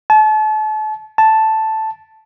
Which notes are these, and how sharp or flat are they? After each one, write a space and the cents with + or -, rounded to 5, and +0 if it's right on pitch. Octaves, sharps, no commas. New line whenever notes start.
A5 -35
A5 +0